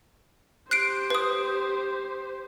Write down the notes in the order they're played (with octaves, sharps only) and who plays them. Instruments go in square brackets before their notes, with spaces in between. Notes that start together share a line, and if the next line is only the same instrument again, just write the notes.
[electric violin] G4 C5 [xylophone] F#6 C7 D7
[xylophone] B4 D#6